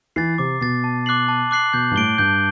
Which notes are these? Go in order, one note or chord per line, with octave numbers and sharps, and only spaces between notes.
E3 A6 C7
C3 D6
B2 A6 C7
A5
D6 F#6 C7 F#7
A5
D6 F#6 C7 F#7
B2 G6
G2
A2 D7 G7
G2 G6